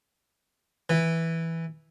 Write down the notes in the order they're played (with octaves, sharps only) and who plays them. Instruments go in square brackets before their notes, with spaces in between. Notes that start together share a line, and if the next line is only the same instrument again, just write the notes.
[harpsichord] E3